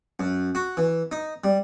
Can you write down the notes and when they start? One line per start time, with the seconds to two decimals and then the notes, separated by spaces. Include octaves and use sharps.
0.19 F#2
0.55 F#4
0.77 E3
1.12 D#4
1.44 G3